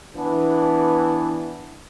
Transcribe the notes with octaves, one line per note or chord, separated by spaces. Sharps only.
E3 B3 D4